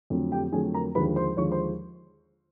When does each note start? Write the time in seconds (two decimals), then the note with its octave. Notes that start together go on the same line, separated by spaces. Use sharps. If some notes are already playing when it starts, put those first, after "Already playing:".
0.10 F2 D3 F#3 A3
0.32 G4 G5
0.52 F2 D3 F#3 A3 G#4 G#5
0.74 A#4 A#5
0.95 D#2 D3 F3 G#3 B4 B5
1.16 C5 C6
1.37 D#2 D3 F3 G#3 C#5 C#6
1.52 C5 C6